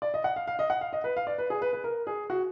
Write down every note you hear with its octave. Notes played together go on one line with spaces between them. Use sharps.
D5
D#5
F#5
F5
F5
D#5
F#5
F5
D#5
B4
F5
D5
B4
G#4
B4
B4
A#4
G#4
F#4